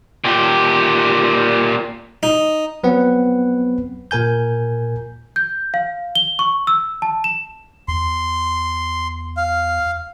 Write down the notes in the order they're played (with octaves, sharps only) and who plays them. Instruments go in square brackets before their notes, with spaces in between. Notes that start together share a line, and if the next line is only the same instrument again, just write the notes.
[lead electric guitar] A#2 G4
[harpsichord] D#4
[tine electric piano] F#3 B3 C4 B4 F#5
A#2 A#4 G#5 G6
[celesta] G6
F5
G7
C#6
E6
A5
E7
[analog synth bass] E2 [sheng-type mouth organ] C6
[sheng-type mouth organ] F5